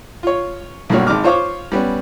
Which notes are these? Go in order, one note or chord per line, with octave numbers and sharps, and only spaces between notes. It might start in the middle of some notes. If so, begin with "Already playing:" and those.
F4 C#5
B1 G2 G3 A#3 F#4 C#5
G#1 D#4 D6 F6
F4 C5 C#5 F5 C#6 D6
G3 B3 C#4